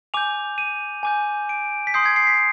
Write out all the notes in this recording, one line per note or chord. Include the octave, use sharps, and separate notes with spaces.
G#5 D6 G6 F7
D#7
G#5 D6 G6
D7
B6
C6 D#6 G6 C7
G#6
C7
B6